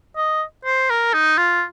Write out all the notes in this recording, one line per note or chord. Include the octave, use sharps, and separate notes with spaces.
D#5
C5
A#4
D#4
F4